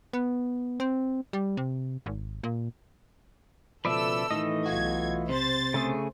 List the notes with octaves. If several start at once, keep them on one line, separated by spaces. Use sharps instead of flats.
B3
C4
G3
C3
G#1
A#2
C#2 B2 F3 A4 B4 D5 E5 E6
A2 D#3 E3 A3 D#5
B1 F4 F#4 G#6
C3 C5 A6
C#3 A3 G#4